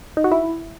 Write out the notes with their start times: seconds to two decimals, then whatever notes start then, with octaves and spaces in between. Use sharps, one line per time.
0.17 D#4
0.24 F#4
0.32 E4